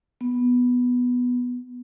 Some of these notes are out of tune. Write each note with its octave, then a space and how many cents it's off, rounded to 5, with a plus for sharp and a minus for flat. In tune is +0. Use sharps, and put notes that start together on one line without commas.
B3 +0